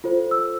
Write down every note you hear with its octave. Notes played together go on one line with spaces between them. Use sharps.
F4 A4 C5
E6